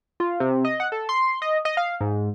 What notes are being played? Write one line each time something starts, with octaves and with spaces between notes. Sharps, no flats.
F4
C3
D#5
F#5
A4
C6
D#5
D#5
F5
G#2